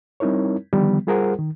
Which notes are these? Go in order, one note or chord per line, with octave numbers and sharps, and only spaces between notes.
G3 C4 D#4 E4 A#4 C#5
D3 D#3 F3 G3 B3
G3 F4 G#4 A#4 C5 F#5
D#3